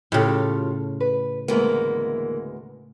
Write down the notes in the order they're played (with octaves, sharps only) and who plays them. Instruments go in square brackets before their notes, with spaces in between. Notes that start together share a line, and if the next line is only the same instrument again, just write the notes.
[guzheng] A2 C#3 [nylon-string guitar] F4 G4 A4
[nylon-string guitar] B4
[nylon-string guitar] D2 G#3 B3 [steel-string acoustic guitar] E3 A#3